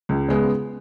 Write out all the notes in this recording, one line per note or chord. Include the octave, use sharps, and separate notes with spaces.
C#2
C#3 G#3 B3